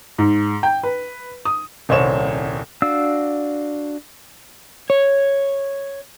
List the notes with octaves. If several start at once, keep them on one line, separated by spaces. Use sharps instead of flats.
G#2
G5
B4
D#6
D#1 C2 C5 C#5 E7
D4 F#4 F5 E6
C#5